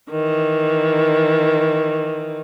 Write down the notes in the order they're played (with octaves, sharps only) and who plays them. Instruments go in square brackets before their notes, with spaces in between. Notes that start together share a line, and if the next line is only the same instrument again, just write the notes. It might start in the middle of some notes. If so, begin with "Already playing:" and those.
[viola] D#3 E3